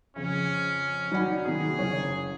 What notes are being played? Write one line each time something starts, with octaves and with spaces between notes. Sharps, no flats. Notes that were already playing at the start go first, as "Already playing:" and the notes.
F2 C#3 C#4
F#3 D#4 D5 F#5 B5
G#2 C3 D#3 A#3 F#4 G#4
F#1 C#5